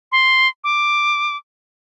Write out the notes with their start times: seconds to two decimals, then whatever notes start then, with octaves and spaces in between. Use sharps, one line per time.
0.12 C6
0.64 D6